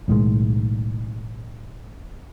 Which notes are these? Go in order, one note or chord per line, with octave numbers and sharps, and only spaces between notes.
B1 A2 D#3 G#3